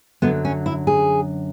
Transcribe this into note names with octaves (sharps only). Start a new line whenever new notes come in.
F#2 D3 F#3 B3
C#4
E4
G#4